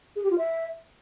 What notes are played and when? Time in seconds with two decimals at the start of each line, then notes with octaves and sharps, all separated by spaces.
0.16 G#4
0.23 G4
0.31 F4
0.38 E5